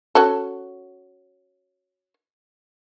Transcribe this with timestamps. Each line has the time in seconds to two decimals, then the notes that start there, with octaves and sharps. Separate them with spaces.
0.15 C#4 F#4 A4